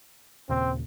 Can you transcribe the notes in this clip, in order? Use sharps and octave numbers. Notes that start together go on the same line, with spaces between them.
D#2 A#2 C#3 C4